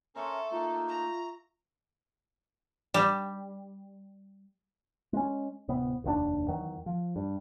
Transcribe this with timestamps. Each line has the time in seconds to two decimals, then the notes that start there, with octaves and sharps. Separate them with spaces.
0.16 C#4 A4 A#4 C5 E5 C#6
0.52 A3 A#3 D#4 F4
0.88 A#5
2.94 G3
5.13 G#3 C#4
5.68 D1 C3 B3
6.04 F1 D#2 C#3 D4
6.48 E2 D#3 F#3
6.86 F3
7.16 G2